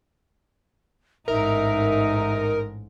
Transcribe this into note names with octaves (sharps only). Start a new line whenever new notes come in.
A1 G#2 D#4 A#4 E5